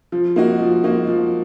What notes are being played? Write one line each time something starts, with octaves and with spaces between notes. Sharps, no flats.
F3
A#3 D#4 F#4
F3
A#3 D#4 F#4
F3